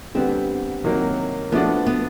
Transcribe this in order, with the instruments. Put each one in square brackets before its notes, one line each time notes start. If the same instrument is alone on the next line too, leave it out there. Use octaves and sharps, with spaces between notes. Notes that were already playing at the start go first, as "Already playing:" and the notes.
[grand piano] D3 G3 B3 [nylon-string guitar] C4
[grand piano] C3 D#3 F#3 A#3
[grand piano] F3 A3 D4 F#4 [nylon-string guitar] B3
[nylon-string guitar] B3